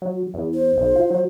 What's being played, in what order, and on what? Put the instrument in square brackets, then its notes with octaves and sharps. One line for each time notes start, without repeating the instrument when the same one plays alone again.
[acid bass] F#3
E2
[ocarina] C5
[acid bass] B1
F4
F#3